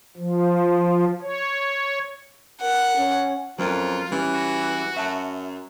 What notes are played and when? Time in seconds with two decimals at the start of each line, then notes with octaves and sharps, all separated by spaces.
0.17 F3
1.21 C#5
2.62 A#4 F#5
2.96 C#4
3.59 F2 F#3 C#4 F4 A#4
4.12 E3 G3 C#4
4.33 F#4
4.96 F#2 E5 A5